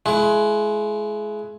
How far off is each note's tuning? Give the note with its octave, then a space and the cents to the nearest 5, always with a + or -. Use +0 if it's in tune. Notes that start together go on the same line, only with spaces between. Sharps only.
G#3 +30 E4 +25